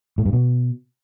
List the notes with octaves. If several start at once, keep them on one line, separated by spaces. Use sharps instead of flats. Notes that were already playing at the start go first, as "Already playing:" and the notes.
A2
G2
B2